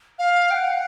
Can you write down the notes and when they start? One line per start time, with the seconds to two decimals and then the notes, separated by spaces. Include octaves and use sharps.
0.19 F5
0.51 G5
0.54 F#5